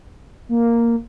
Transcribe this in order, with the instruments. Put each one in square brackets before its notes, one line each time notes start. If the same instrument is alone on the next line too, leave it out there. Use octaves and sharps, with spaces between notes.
[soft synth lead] A#3